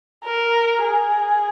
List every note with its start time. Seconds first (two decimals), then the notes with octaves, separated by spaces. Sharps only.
0.24 A#4
0.84 G#4